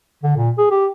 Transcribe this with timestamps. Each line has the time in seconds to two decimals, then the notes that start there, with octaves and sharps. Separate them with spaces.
0.24 D3
0.37 A#2
0.58 G#4
0.71 G4